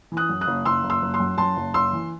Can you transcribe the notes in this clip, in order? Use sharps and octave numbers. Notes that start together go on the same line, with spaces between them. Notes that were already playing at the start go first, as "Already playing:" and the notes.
E3
D#6 F#6
F#2
D#6 F#6
F#1
F#1 C6 E6
F#1
C6 E6
F#1
C6 E6
F#2
F#2 A5 C6
F#1
F#1 C6 E6
E3